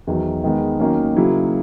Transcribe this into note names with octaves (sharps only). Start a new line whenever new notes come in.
E2 D#3 F#3
D#3 G#3 B3
D#3 F#3 A#3 C#4
C#3 F#3 A#3 E4